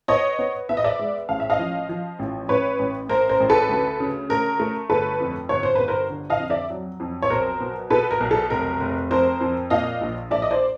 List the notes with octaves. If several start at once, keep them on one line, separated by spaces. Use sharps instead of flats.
B3 C#5 D#5
B3
B3 E5
D#5
D5 E5
G#3
A1 F5
E5
D#5 F5
F3
F3
A1
A1 B4 C#5
A1
A1 A#4 C5
A#4 C5
A1
A4 B4
D2
C#3
A3 A#4
A3
G1 A4 B4
F2
G1 C#5
C5
G1 B4
A#4 C5
D3
D#5 F5
F2
D5 E5
F#3
F2
C#5
B1 A#4 C5
B2
B2 A4 B4
A#4
B1
A4
F1 A#4
F1
F2 A#4 C5
F2
A#2 D#5 F5
A#1
A#1 D5 E5
D#5
C5 D5